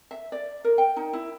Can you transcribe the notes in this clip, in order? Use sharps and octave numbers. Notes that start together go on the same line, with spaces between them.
E5
D5
A#4
G5
D#4
E4